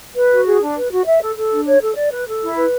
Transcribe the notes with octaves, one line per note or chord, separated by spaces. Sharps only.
B4
F#4
G#4
D4
B4
F#4
E5
A4
A4
D4
C#5
A4
D5
B4
A4
E4
B4